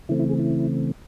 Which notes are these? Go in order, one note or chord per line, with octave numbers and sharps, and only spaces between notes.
C#3 E3 A3 C4 E4
E4
G#4
E4